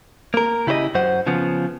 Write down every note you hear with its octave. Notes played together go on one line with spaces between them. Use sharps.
A#3 A#4
C#3 E4 G4 C5 D#5
F#2 F#3 C5 F#5
C#3 F3 B3